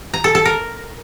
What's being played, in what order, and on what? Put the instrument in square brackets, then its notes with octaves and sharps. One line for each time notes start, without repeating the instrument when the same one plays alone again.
[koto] A#5
A4
A4
A#4